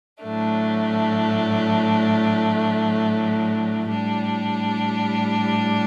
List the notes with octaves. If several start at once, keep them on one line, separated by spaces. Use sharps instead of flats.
A2 F#3 A3 D4
A2 G3 D4